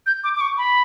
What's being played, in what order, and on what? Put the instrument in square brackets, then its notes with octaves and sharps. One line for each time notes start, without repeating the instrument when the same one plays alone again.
[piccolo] G6
D6
D6
C#6
B5